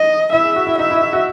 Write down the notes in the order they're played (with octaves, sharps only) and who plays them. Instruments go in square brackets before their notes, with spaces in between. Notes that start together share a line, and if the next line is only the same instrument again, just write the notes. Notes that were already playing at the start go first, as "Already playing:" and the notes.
Already playing: [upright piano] D#4 [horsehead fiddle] D#5
[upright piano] E4 [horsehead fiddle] E5
[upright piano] G#4
F#4
E4
[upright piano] D#4 [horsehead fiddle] E5
[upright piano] E4
E4
F#4